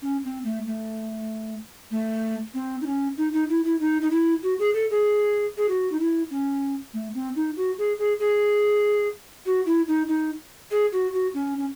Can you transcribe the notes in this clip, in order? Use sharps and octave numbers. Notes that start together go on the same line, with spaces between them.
C#4
C4
A3
A3
A3
C4
D#4
C#4
D#4
D#4
E4
E4
D#4
D#4
E4
F#4
G#4
A4
G#4
G#4
F#4
D#4
E4
C#4
A3
C4
D#4
F#4
G#4
G#4
G#4
F#4
E4
D#4
D#4
G#4
F#4
F#4
C#4
C#4